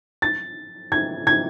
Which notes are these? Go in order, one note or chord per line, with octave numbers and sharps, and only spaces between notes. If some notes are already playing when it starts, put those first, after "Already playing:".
A6
G#6
G#6